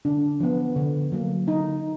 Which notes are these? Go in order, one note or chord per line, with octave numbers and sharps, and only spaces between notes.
D3 D4
F3 B3
D3
F#3 A#3
D3 D#4